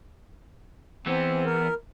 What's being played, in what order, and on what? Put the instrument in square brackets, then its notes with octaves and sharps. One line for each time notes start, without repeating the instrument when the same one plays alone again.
[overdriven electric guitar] E3 B3 [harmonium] C4
[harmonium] A#4